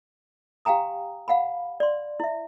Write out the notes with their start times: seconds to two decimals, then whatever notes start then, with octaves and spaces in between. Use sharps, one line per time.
0.65 G4 F5 G5 G#5 A#5 D#6
1.28 F5 F#5 G#5 B5
1.80 D5 C6
2.20 E4 E5